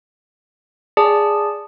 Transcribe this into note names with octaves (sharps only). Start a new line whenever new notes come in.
G#4 D5 A5